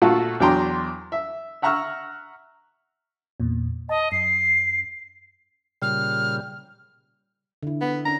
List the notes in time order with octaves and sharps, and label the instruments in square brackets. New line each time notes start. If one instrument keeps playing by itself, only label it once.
[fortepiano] A#2 A3 F4 F#4 A4 F#5
E2 F#3 D4 G5 A#5 C6
E5
E5 F#5 A#5 C#6 E6 F6
[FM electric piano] E2 A#2
[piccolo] D#5 [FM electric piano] A5
[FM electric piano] F#2 [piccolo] C7
[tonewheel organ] A#2 C#3 G3 [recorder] F6
[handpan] D3 E4
[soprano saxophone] B3
[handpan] C#4 D4 [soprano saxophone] A#5